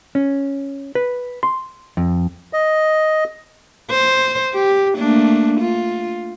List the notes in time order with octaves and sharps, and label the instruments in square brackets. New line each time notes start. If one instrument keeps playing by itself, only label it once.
[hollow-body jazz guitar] C#4
B4
C6
F2
[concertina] D#5
[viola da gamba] C5
G4
A3 A#3 D4
F4